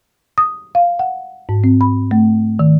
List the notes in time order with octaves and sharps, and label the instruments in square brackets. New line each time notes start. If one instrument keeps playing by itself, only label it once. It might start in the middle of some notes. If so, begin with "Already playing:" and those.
[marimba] D#6
F5
F#5
G#2
C4
B5
A3
D#3